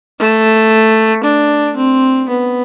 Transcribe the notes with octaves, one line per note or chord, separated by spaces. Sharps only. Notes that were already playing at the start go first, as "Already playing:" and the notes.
A3
D4
C4
B3